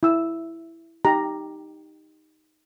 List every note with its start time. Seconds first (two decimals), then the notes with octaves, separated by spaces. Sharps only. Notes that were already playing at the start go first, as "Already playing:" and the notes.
0.03 E4 E6
1.05 D#4 G4 A#5